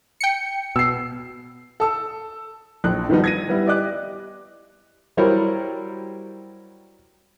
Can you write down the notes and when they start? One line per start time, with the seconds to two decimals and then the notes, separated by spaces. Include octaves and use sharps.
0.20 G5 C#7
0.76 B2 E6 C7
1.80 A4 E6
2.84 A#1 F#6
3.09 D#3 F3 G3 B3 D#4
3.24 G#6 A#6 D#7
3.49 G3 B3 E4
3.67 G4 D5 D#5 D6 F#6
5.17 F#3 G3 E4 A#4 C5 C#5